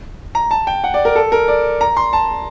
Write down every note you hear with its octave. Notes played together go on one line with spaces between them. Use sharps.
A#5
A5
G5
F#5
D5
A#4
A4
A#4
D5
A#5
C6
A5